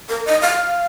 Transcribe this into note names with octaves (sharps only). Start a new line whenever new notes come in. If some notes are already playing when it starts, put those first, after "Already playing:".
A#4
D#5
F5